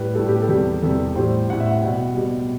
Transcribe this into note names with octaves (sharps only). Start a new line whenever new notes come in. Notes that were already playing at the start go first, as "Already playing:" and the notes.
Already playing: A2 G3 B4
A2 G3 A4
G4
A4
E2 C3 G3
E2 C3 G3 A4
A2 G3 C5
A2 G3 F#5
E5
F#5
B2 G3
B2 G3